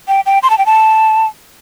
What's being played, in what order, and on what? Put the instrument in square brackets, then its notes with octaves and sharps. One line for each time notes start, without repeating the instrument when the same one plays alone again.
[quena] G5
G5
C6
A5
G5
A5